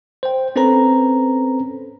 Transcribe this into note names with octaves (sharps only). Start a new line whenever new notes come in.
C5 G5
C4 C#4 A4 B4 C5 A#5